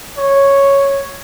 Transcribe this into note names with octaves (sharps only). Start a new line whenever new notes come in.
C#5